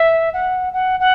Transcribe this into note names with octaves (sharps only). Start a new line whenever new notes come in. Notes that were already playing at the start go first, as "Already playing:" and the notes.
Already playing: E5
F#5
F#5
F#5